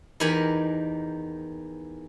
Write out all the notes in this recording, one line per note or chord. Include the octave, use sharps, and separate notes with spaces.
E2 D#3 G4 A#4 G#5 B5